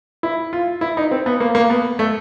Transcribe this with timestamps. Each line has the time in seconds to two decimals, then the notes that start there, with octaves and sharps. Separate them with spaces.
0.23 E4
0.53 F4
0.81 E4
0.97 D#4
1.11 C4
1.26 B3
1.40 A#3
1.55 A#3
1.70 B3
1.99 A3